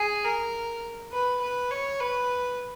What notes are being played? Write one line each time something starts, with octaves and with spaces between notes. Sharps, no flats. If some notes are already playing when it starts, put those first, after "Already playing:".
Already playing: G#4
A#4
B4
B4
C#5
B4